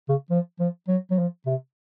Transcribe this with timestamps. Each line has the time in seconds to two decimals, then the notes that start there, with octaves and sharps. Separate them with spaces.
0.09 C#3
0.30 F3
0.59 F3
0.88 F#3
1.11 F#3
1.18 F3
1.46 C3